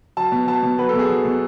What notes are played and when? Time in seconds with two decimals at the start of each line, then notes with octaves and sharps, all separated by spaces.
0.17 F#3 A5
0.32 B2
0.47 F#3 A5
0.63 B2
0.78 F#3 B4
0.89 A4
0.94 B2
0.99 G#4
1.09 F#3
1.25 B2